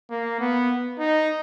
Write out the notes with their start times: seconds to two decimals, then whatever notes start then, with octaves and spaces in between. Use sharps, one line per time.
0.10 A#3
0.40 B3
0.99 D#4